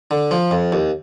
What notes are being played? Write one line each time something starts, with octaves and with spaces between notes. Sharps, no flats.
D3
F3
F2
D#2